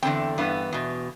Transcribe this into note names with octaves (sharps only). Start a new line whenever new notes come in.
E2 D3 G3 C4 G5
G2 E3 B3
E2 B2